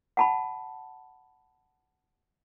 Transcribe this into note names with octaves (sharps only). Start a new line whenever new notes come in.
F#5 A5 B5